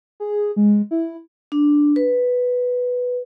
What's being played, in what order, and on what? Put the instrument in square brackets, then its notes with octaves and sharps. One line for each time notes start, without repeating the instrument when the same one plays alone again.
[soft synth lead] G#4
G#3
E4
[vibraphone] D4
B4